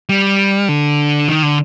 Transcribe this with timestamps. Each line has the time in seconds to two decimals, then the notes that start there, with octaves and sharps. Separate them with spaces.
0.09 G3
0.69 D3
1.29 D#3
1.43 D3